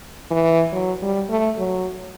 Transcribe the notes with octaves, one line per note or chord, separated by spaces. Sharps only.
E3
F#3
G3
A3
F#3